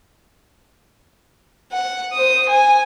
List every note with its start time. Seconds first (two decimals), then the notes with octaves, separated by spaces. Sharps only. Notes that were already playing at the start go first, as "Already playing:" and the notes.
1.72 F#5
2.13 C5 D#6
2.49 G#5